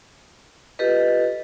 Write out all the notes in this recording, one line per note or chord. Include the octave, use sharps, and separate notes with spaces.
F4 G4 A4 B4 D#5